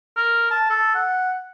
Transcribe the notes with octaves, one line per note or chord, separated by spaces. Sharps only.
A#4
A5
A4
F#5